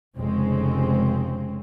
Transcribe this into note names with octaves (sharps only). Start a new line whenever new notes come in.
F1 C#3 F3 G#3 C4 C#4